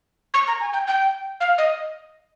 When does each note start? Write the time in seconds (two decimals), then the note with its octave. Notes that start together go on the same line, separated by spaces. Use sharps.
0.34 C#6
0.48 A#5
0.61 G#5
0.73 G5
0.87 G5
1.40 F5
1.58 D#5